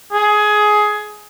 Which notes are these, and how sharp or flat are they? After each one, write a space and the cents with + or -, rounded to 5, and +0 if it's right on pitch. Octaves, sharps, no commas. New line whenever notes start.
G#4 +15